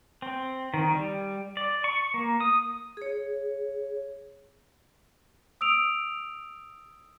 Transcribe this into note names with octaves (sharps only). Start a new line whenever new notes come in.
C4
D#3
G3
D5
C#6
A#3
D#6
G#4 C#5
D#6 E6 D7 F7